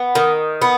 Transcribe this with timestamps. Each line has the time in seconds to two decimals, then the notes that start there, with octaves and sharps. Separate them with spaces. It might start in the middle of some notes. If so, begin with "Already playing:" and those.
Already playing: B3
0.15 D#3
0.62 B3